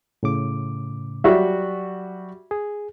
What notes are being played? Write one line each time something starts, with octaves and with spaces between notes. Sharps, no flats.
A2 C#3 D6
F#3 G3 F#4 E5
G#4